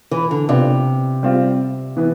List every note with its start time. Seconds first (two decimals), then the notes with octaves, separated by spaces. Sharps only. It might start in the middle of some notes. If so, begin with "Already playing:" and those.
0.11 E3
0.31 D3
0.49 C3 B3 D4 F4 B4 D5
1.23 G3 C4 F4
1.97 E3 B3 E4